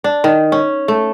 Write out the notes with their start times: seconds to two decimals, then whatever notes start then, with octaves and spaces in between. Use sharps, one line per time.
0.04 D4
0.24 D#3
0.52 C#4
0.88 A3